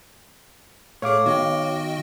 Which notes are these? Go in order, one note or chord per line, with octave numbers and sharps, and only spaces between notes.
A2 A3 G#4 C#5 F5 D6
D#3 B3 F#4 D#5 G5